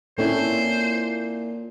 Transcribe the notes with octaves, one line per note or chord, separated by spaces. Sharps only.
A#2 A#3 C4 C#4 E4 A4 C5 C#5